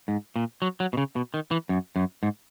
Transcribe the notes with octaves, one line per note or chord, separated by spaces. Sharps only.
G#2
A#2
F#3
F#3
B2
C#3
B2
D#3
E3
F#2
F#2
G#2